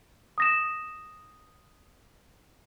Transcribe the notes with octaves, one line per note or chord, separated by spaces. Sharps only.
D#6 A#6 E7